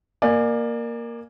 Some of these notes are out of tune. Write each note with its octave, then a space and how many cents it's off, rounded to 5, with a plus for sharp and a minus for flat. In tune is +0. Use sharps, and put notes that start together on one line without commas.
A#3 +0 D5 +30 G#5 +0